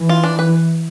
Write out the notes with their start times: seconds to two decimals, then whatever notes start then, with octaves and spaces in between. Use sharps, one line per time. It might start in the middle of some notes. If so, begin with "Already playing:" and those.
Already playing: E3
0.09 F4
0.23 D4
0.39 B4